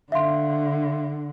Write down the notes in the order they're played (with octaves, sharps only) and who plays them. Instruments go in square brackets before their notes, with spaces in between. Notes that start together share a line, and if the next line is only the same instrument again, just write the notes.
[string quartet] D3 [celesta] E5 F5 C6